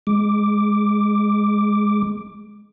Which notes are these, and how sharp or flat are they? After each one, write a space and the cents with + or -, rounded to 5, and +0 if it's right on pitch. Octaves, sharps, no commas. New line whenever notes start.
G#3 +0 D6 +0